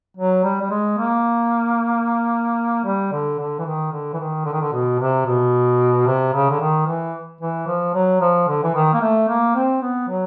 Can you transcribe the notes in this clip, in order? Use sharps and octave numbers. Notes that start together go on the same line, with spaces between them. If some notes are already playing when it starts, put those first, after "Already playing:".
F#3
G3
G3
G#3
A#3
G3
D3
D3
E3
D#3
D3
E3
D#3
D3
D#3
D3
B2
C3
B2
C3
C#3
D3
D#3
E3
E3
F3
F#3
F3
D3
E3
D#3
A#3
A3
A#3
C4
B3
F#3